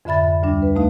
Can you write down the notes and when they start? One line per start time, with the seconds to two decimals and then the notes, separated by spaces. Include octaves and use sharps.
0.05 F2 G#2 D3 E5 B5 A6
0.24 E5
0.43 D2 G3 D4
0.62 B4
0.75 D#2 A3 D#4 F5